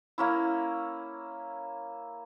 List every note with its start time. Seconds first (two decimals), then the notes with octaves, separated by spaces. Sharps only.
0.18 A#3 C#4 E4